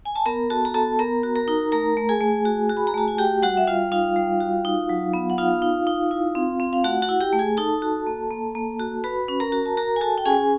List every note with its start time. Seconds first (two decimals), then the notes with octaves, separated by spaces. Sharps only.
0.05 G#5
0.16 A5
0.26 B3 A#4 A#5
0.50 F#4 A4 A5
0.65 A#5
0.74 B3 A4 A5
0.99 B3 A#4 A#5
1.23 F#4
1.36 A#4 A#5
1.48 D#4
1.72 A3 A#4 A#5
1.97 A3
2.09 G#4 G#5
2.21 A3
2.45 F#4
2.70 F#4
2.77 B5
2.87 A#5
2.94 A3 A5
3.08 G#5
3.18 F#4 G4 G5
3.42 G3 F#4 F#5
3.57 E5
3.67 G3 F4 F5
3.92 D#4 F4 F5
4.16 G3
4.40 F#4
4.65 D#4
4.89 F#3
5.14 B3
5.30 F#5
5.38 D#4 F4 F5
5.62 D#4
5.87 D#4
6.11 E4
6.35 C4
6.60 C4
6.73 F5
6.84 A3 F#4 F#5
7.02 F#4 F#5
7.09 E4
7.20 G4 G5
7.33 A3
7.39 G#4 G#5
7.57 D#4 A4 A5
7.82 F#4
8.07 A#3
8.31 A#3
8.55 A#3
8.79 F#4
9.04 F#4 B4 B5
9.28 C#4
9.40 A#4 A#5
9.52 F#4
9.66 A5
9.77 F#4 A#4 A#5
9.96 G#5
10.01 F#4 A4 A5
10.18 G5
10.25 C#4 G#4 G#5